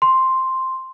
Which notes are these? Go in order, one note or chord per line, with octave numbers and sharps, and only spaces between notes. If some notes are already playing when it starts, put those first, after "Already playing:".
C6